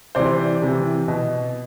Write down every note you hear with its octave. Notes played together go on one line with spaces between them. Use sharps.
C3 E3 C5 D5
C3 E3
B2